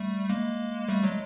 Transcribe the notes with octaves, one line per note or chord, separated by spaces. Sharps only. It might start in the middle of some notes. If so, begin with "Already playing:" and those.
Already playing: G3 A3
G#3 A#3
G3 A3
F#3 G#3